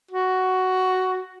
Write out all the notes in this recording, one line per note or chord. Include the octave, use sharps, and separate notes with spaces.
F#4